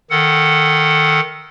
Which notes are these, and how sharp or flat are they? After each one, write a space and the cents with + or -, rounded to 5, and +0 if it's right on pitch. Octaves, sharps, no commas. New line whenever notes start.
D#3 +0 A4 +0 F#5 +0